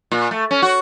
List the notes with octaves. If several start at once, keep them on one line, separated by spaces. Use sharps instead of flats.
A#2
A3
C#4
F#4